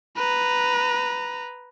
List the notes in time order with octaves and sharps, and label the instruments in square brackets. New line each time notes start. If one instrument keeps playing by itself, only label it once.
[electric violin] B4 A#5